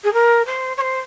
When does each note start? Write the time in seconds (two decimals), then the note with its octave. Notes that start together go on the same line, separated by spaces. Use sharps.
0.04 G#4
0.13 A#4
0.46 C5
0.77 C#5
0.81 C5